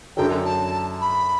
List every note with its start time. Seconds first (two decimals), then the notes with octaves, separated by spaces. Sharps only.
0.16 F#2 D3 F#3 G5
0.45 A5
1.01 B5